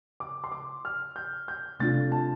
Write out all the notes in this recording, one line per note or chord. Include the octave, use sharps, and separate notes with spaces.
D6
C6
D6
F6
G6
G6
C3 A3 D4 F4 A6
A5